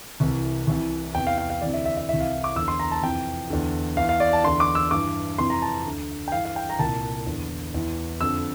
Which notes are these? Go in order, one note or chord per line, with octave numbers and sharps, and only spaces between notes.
C2 C3 E3
C2 C3 E3
E2 C3 E3 G5
F5
F5
F5
D2 C3 E3 D5
E5
E5
E5
C2 C3 E3 E5
F5
D6
E2 D3 E6
C6
A#5
A5
F2 C3 E3 G5
E2 D3
E2 E3 F5
F5
D5
A5
E2 D3 C6
D6
E6
G2 E3 D6
F2 C3 E3 C6
A#5
A5
D2 D3
G5
G2 E3 F5
F5
G5
A#5
C2 A#2 A5
E2 D3
E2 E3
F2 D3 E6